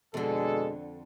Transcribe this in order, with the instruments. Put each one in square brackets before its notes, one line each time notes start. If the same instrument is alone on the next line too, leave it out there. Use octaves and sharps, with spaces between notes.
[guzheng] F2 D3 [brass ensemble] B2 G#3 A4